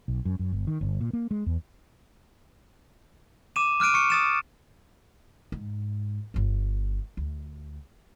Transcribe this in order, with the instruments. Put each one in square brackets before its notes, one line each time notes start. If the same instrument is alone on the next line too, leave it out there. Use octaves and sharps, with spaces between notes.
[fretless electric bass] B1
F#2
F#2
G1
D#3
G1
A#2
A#3
G#3
E2
[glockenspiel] D6 D#7 E7
D6 F6 F#6 D7 D#7
C#6 C#7
D#6 A6 E7
[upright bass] G#2
G1 D3
D2